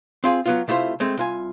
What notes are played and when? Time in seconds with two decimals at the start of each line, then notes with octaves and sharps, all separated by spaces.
0.24 C4 F4 G#4
0.46 F#3 B3 F4
0.68 C3 A3 E4 F4 C5
1.00 G#3 A3 C4
1.17 C2 F4 G#5